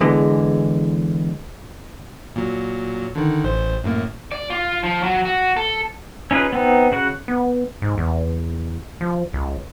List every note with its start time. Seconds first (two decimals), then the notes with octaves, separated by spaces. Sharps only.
0.01 E2 D3 E3 G#3
2.36 A#2 F#3
3.15 D3 D#3
3.44 A1 C5
3.84 F#2 A2 A#3
4.32 D5
4.50 F4
4.83 F3
5.03 F#3
5.25 F#4
5.57 A4
6.31 C#4 D#4 F4 G#4 B4
6.53 B3 C4 D#4
6.92 C#3 F#4 F#5
7.28 B3
7.82 G#2
7.98 E2
9.01 F3
9.33 C#2